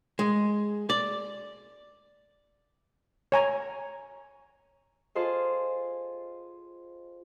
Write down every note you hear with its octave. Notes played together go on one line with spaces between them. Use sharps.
G#3
D5
C#5 G#5 A#5
F4 G#4 A4 C5 D#5